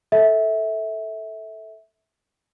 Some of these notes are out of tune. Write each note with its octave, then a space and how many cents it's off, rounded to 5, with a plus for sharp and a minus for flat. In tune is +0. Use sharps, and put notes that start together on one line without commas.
A4 +0 E5 -20